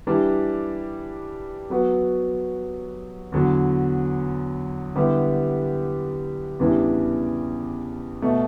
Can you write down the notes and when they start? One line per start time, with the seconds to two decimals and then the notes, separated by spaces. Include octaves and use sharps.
0.07 E3 G3 D4
1.70 F#3 B3 F#4
3.32 E2 D3 F#3
4.95 D3 G3 B3 E4 G4
6.59 E2 C#3 E3 G3 D4
8.22 B2 A3